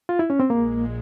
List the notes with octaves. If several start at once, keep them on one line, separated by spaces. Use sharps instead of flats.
F4
E4
C#4
C4
A#1 A#2 G#3 A#3